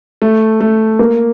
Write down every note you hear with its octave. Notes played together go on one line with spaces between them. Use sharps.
A3
A3
A#3